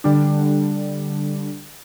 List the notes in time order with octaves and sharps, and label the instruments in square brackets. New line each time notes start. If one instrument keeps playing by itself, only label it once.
[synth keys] D3 G3 D4